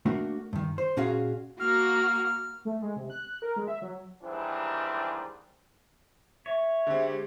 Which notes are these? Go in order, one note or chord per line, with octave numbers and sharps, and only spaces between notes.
A3 A#3 D4 F#4
G2 D#3
C5
A#2 C#4 F#4 G#4 F5
A#3 F#4 F6
A3
G#3
C3
F#6
A#4
G#3
E5
F#3
D#2 G#2 E3 G3 C4 D4
C#5 E5
D3 G#3 C4 G4